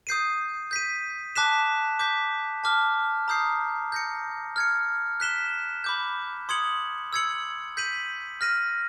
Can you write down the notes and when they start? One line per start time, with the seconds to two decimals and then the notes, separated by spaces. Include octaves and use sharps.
0.07 D#6 G6 C7 D#7
0.71 G6 B6 D#7
1.36 A5 D6 F#6 B6 E7
1.99 D6 G6 B6
2.64 A5 D6 F6
3.28 A#5 D#6 G6 C7
3.92 G6 A#6 C#7
4.56 F6 G#6 C#7
5.20 F#6 B6 E7 G7
5.84 B5 D6 G6
6.49 C6 D#6 G#6 C#7 F#7
7.13 E6 G#6 C#7 F#7
7.77 G6 B6 D#7 F#7
8.41 F6 A#6 D#7